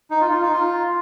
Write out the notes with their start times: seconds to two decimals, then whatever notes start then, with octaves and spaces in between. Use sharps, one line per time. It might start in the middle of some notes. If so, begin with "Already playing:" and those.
0.10 D#4
0.21 F4
0.31 F4
0.41 D#4
0.52 F4